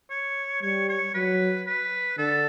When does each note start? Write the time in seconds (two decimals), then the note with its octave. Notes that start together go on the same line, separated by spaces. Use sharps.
0.10 C#5
0.62 G3 C#5
0.89 C#5
1.14 F#3 B4
1.66 B4
2.18 D3 A4